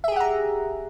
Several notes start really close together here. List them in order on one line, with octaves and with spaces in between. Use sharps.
E5 G#4 G4 F#5 A#5